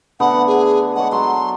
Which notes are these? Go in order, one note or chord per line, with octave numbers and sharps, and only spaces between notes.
D3 A3 B3 F#5
G#4
G#3 C#5 F#5
F#3 A4 C6